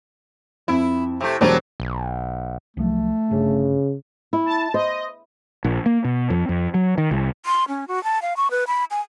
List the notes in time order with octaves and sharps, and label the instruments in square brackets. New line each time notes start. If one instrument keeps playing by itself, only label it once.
[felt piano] F2 [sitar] E4
[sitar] C3 A3
[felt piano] E1 C5 [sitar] F#3 G3 D4
[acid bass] B1
[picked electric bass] C2 F3 F#3 [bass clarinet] A3
[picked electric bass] G1 C#4 D4 [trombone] C#3
[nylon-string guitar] E4
[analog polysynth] A5
[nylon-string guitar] C5 [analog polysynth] D#5
[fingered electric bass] A#1
A#3
B2
F2
F2
F#3
D#3
C2
[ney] C6
C#4
F#4
A5
F5
C#6
B4
B5
G#5